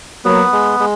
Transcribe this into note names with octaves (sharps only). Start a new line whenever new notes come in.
F#3 A#3 B3
G#3
G#3